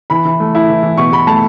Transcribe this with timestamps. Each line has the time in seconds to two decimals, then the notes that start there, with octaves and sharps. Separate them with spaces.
0.10 E3 B5
0.25 E3
0.40 A3
0.55 E4
0.69 E3
0.83 E3
0.97 B2 C#6
1.12 B2 B5
1.27 A3 A5